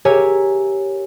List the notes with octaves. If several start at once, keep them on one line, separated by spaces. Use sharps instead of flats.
G4 A#4 C#5 E5 G#5